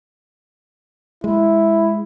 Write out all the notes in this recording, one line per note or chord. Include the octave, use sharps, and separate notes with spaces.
G#3 E4